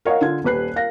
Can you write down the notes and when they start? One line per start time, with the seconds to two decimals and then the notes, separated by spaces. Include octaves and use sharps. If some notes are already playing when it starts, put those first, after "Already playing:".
0.05 A#4 C#5 D#5 F5 F#5
0.21 D3 F4 G#6
0.44 D#1 G4 B4 F#6 C7
0.76 A#4 F5 A#6